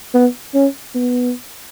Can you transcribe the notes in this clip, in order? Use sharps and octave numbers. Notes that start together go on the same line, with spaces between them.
B3
C#4
B3